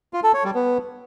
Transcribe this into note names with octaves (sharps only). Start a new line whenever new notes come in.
F4
A4
C#5
G3
B3